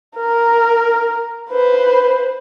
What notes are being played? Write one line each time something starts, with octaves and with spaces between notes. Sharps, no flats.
A#4
B4 C5